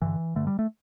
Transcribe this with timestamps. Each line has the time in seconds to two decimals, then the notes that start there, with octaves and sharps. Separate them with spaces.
0.02 G2 D3 E3
0.35 G2 D3 A3
0.47 G3
0.59 A3